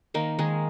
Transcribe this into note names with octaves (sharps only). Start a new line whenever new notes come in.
D#3 A#3 D#4
D#3 G#3 G#4